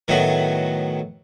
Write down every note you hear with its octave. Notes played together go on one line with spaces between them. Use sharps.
A2 D#3 F#3 B3 E4 F#4